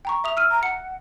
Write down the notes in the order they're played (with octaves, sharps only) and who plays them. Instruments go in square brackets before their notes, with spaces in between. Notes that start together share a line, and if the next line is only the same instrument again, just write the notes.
[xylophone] G5 A#5 C#6
E5 D#6 F7
E6 F6 D#7
[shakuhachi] A#5
[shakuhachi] F#5 [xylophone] C#7